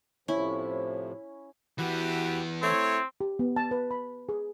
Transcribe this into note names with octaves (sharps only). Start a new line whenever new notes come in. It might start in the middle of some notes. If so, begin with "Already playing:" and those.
A2 C3 F3 C#4 E4
E3 B3 E4 F#4 G4
A3 C4 E4 C#5
G4
B3
A5
B4
B5
G#4